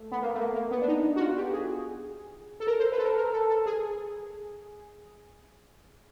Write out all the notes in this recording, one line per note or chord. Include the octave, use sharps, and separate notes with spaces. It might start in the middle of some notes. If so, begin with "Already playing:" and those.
Already playing: A3
B3
A#3
A3
A#3
A#3
B3
D4
D#4
F#4
F4
G4
G#4
A4
A#4
C5
B4
A4
A#4
A#4
A4
A4
G#4